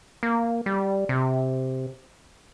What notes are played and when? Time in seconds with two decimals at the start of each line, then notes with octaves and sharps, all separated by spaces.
0.23 A#3
0.66 G3
1.09 C3